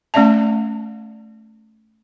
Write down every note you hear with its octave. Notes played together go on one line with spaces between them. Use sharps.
A3 C#4 D5 E5 A5